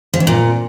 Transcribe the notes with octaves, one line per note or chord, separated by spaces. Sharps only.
F3
F2
A#2